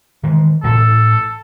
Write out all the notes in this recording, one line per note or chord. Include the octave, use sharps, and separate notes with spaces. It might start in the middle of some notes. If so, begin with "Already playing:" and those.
D#3 E3 G#3
E1 A1 A2 A4